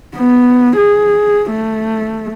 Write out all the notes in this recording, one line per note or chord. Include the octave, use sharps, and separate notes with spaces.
B3
G#4
A3